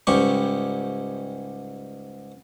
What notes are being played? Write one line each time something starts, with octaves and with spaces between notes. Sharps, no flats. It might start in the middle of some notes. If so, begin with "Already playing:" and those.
C#2 G#2 G3 G4 C#6